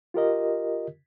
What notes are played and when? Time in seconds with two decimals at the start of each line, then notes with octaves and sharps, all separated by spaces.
0.14 F4 G4 A#4 D#5